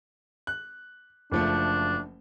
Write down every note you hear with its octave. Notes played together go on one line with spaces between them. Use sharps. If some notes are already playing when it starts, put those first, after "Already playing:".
F#6
F#1 F3 A3 D4